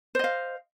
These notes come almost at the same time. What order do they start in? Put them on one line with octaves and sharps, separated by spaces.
C5 D#5 F5